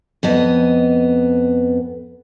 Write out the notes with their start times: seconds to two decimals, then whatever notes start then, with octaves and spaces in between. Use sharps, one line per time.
0.23 F2 B3 D#5